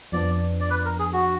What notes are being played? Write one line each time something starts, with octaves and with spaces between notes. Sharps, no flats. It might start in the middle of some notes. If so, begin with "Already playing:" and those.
F2 F3 B3 D4 D5
D5
B4
A#4
G#4
F#4